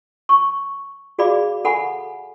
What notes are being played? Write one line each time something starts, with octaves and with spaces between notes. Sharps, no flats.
C#6
F#4 G#4 D5 F5 B5 D6
A4 F#5 G#5 B5